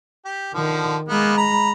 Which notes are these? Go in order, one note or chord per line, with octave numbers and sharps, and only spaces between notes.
G4
D3 D#3 F3
G#3 A#3 B3
A#5 B5